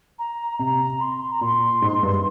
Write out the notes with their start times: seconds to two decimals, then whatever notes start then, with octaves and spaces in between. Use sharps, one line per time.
0.18 A#5
0.59 C3 A#5
1.00 C6
1.31 A#5
1.41 A#2 C6
1.82 G#2
2.03 G2